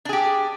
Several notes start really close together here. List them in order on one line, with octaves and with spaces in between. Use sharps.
D4 G#4 G4